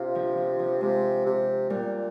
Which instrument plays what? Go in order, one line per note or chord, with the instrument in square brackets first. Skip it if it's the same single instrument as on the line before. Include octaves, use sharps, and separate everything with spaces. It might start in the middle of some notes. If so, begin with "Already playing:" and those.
Already playing: [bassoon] C3 [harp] D4 F4
[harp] F3
F3
F3
[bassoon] C3 [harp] G#3
[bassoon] C3
[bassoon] A#2 [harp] G3